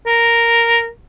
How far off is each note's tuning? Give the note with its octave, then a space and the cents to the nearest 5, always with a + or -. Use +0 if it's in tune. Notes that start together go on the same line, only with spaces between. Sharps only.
A#4 -5